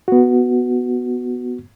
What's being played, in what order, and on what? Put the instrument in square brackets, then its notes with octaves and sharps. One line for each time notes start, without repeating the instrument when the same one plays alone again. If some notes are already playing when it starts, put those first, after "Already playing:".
[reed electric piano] B3 F#4